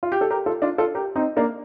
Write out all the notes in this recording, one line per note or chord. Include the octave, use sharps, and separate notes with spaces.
F4
G4
A4
G4 A#4
F4 A4
D4 F4
F4 A4
G4 A#4
C4 D#4
A#3 D4